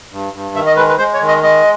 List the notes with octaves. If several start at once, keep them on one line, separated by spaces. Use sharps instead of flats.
G2
G2
D#3 E5
D#5
G#3 B4
B4
G#3 C5
C#5
D#3
D#5
G#3 D#5